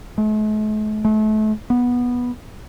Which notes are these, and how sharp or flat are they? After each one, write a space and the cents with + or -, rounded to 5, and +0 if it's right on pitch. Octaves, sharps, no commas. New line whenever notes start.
A3 -45
A3 -35
B3 -15